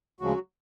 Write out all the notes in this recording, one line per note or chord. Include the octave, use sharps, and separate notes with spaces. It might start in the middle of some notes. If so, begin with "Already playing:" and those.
D2 C#3 F3 F#3 G#3 C#4 F#4